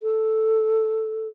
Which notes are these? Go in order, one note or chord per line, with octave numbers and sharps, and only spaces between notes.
A4